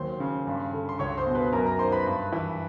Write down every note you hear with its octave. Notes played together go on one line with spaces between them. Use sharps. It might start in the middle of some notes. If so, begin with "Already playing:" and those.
Already playing: D#2 A#2 F#3 C5 C6
C#3
G2
D3
C6
C#2 C#5 C#6
C5 C6
B2
B4 B5
F#2 A#4 A#5
A#4 A#5
D#3 C5 C6
B4 B5
G2
E3